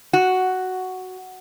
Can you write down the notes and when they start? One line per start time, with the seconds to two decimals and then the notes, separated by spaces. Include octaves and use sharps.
0.13 F#4